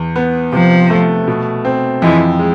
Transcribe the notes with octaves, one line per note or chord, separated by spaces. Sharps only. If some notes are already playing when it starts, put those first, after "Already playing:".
Already playing: E2
B3
C3 F3
A3
B2
C4
F2 E3 G#3
G#3